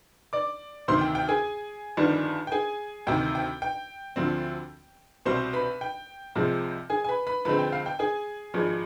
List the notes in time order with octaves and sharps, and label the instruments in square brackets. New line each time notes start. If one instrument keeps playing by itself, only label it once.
[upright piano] D5 D6
D2 C3 D#3 C5 C6
G5
G5
G#4 G#5
G1 F2 D#3 G3 D4
G5
G#4 G#5
D2 C3 D#3 G5
G5
G5
D2 D3 F3 C4
C2 B2 G3 C4 C5 C6
B4 B5
G5
C2 C3 F3 G#3 C4
G#4 G#5
G#5
B4 B5
B4 B5
F2 D3 G#3 C4 B4 B5
G5
F5
G5
G#4 G#5
G#1 G2 F3 G#3